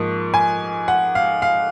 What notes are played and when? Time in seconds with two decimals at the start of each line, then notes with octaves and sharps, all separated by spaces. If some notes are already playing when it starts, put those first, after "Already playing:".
Already playing: G#2 F3 A#3 C#6
0.34 G#5
0.88 F#5
1.15 F5
1.42 F5